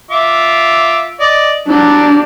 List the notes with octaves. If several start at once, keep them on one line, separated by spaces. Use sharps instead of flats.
F4 E5 D6
D5 D#5
F#3 G3 D4